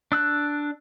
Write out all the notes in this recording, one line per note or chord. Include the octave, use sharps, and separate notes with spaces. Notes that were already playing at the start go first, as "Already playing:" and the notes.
D4 E6 F#6